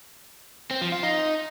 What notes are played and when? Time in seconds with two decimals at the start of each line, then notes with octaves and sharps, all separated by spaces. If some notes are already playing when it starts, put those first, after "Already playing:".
0.71 C4
0.81 F3
0.92 F4
1.03 D#4